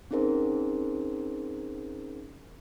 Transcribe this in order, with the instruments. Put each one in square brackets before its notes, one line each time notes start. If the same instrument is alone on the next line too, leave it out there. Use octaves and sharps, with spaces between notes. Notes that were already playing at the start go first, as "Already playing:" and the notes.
[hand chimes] C4 C#4 D#4 G#4 A#4 C5